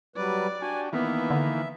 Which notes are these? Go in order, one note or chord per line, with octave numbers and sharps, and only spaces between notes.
F#3 G3 B4 D5
D4 F#4 G4 G#5
D#3 E3 A#3 B3 E5
D3